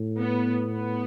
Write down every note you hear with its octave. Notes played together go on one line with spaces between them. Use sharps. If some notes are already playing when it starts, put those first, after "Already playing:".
Already playing: A2
B3
B3